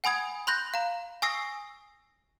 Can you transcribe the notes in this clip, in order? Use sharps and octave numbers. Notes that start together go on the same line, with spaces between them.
F#5 G#5 B5 D#6 G#6
B5 C6 F#6 G6 A#6
F5 A#5
G#5 C#6 D#6 E6 A#6 C7